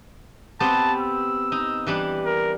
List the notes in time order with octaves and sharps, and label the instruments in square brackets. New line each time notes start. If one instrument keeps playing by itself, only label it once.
[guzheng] B3 C4 G4 [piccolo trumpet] A5
[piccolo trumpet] E6
[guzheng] D#4
E3 G3 D4
[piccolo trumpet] A#4